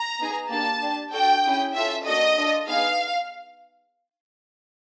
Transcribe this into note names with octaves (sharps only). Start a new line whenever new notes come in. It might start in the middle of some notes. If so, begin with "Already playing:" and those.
Already playing: A#5
B3 D#4 G#4
A#3 D4 G4 A5
D4 G4
D4 F#4 A4 G5
C#4 E4 G#4
C#4 F4 A4 E5
A#3 D4 F#4 A4 D#5
D4 F4 A4
B3 D#4 G#4 F5